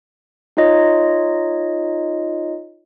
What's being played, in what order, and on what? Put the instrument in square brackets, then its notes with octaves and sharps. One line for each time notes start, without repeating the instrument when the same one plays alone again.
[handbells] D#4 F4 C#5 D#5